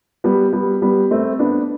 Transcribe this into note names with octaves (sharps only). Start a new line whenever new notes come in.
G3 B3
G3 B3
G3 B3
A3 C4
B3 D4